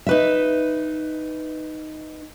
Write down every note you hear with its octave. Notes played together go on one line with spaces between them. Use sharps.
D#4 B4 E5